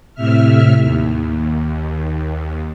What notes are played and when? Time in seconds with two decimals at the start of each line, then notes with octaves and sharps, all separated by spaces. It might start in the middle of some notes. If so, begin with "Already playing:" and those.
0.14 A2 C3 E5 F6
0.81 D#2